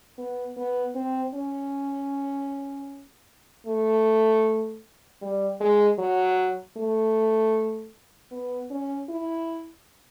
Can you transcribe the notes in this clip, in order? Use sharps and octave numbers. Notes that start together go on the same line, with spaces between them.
B3
B3
C4
C#4
A3
G3
G#3
F#3
A3
B3
C#4
E4